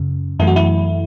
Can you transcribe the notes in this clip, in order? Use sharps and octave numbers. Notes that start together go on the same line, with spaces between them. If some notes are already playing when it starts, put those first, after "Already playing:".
Already playing: F#2 C#3
F#2 E3 A3 E4
F#4
E4